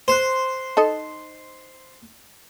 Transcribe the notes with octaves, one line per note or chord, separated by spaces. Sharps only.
C5 C6 F#6
D#4 A4 D#5